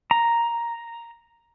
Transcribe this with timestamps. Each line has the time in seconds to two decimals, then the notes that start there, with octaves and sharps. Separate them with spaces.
0.11 A#5